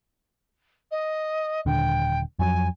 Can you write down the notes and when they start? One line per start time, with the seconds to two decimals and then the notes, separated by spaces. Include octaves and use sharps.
0.91 D#5
1.66 D#1 D3 G5
2.39 F2 F#3 G#5